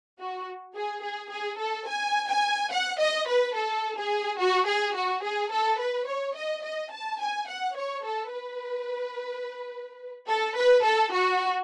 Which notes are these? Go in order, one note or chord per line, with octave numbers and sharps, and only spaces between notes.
F#4
G#4
G#4
G#4
A4
G#5
G#5
F#5
D#5
B4
A4
G#4
F#4
G#4
F#4
G#4
A4
B4
C#5
D#5
D#5
A5
G#5
F#5
C#5
A4
B4
A4
B4
A4
F#4